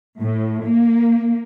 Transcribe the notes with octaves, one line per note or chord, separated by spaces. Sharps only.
A2
A#3